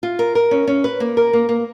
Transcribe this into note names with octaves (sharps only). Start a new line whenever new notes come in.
F4
A#4
A#4
C#4
C#4
B4
A#3
A#4
A#3
A#3